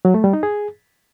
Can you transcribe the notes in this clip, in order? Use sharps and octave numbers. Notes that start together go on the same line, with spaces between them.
F#3
A3
G3
D#4
G#4